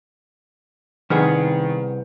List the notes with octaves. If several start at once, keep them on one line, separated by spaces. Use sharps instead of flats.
C2 D#3 B3 G#4